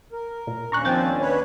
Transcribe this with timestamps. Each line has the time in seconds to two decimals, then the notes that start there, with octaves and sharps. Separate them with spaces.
0.12 A#4
0.47 A#2
0.72 D#2 C#4 D4 A#5 C#6 F#6
0.85 F3 C4 G5 G#6 A6
1.21 B4 C#5